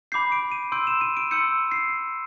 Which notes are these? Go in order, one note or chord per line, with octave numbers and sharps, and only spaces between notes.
B5 D6 G6 C7
D7
D#7
C6 E6 G6 D7
E7
D#7
D7
C6 E6 G6 C#7
C7